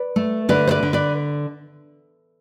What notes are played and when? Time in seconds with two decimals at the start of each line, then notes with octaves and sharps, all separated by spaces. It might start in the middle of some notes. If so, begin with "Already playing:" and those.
Already playing: B4 D5
0.16 A3
0.49 D3 B4 D5
0.67 C5
0.71 B4 D5
0.83 D3
0.93 B4 D5